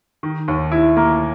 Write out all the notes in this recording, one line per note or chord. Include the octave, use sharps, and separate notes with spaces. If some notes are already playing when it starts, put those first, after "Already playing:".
D#3
D#2
E4
A#3